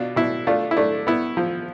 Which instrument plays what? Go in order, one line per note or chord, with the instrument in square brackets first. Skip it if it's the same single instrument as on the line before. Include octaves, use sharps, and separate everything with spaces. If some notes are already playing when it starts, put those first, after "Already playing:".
Already playing: [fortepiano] B2 D4 F4
B2 E4
A3 D4 F4
E4
A3 D4
B3 E4
F3